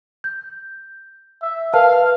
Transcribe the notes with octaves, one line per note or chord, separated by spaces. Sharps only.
G6
E5
A#4 B4 F5 A5